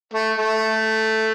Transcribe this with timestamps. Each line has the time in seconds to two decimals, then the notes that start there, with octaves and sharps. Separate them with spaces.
0.14 A3
0.38 A3